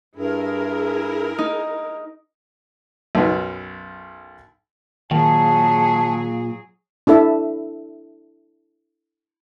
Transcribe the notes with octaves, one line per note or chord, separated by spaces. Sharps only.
G2 E4 G#4 A#4
D#4
B1 F#2 B3 D#4
A#2 D#3 F#3 G#4 A5
D4 E4 A4 E5